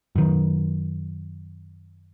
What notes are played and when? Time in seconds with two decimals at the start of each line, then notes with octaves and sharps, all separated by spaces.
0.16 F#2 D#3